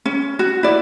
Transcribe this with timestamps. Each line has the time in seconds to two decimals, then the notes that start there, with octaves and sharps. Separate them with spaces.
0.05 C#4
0.39 F#4
0.63 E4 D5